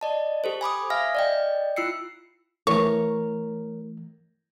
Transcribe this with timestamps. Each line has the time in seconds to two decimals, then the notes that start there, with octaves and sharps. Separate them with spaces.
0.01 D5 D#5 A5
0.44 G4 A4 C5
0.61 G#5 B5 D6 D#6
0.90 E5 F5 G#5 F6 A#6
1.15 D5 D#5 G5
1.76 E4 F4 E6 C7 C#7
2.67 E3 A3 A#4 C#5 C#6